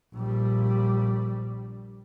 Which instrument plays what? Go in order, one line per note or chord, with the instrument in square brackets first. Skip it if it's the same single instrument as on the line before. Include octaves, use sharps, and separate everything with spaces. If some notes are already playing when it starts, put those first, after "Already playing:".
[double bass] A#1 G3